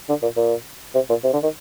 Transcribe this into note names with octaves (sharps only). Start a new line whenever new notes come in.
D3
A#2
A#2
C3
A#2
C3
D3
D#3